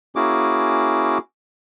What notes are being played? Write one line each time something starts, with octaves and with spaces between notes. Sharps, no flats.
A#3 C#4 E4 F#4 G#4 D6